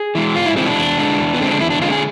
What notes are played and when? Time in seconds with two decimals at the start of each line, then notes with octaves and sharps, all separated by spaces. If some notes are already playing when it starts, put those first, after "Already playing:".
Already playing: G#4
0.15 E3 G#3
0.35 G#2 F4
0.46 E4
0.56 E3 G#3 C4
0.67 D4
0.77 E2
0.98 D3 G#3
1.19 E2
1.34 B3
1.39 D3 G#3 C4
1.51 D4
1.60 E2 E4
1.71 D4
1.82 D3 G#3 F4
1.91 G#4